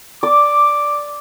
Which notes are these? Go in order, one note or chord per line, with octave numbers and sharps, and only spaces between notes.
D5 D6